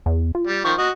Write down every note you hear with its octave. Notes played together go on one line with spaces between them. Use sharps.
E2
F4
G3
D#3 F3 C#6
F#4 D#5